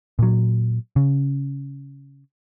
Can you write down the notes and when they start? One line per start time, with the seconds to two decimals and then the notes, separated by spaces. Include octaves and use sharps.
0.19 A#2 F#3
0.96 C#3